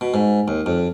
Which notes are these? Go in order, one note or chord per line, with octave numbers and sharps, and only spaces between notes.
B2
G#2
D#2
F2